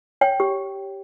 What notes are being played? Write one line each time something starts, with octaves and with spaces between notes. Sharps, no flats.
C#5 G5
G4